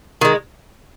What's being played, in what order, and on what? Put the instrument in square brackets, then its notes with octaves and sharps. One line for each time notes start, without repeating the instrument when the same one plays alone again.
[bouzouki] D#3 G#3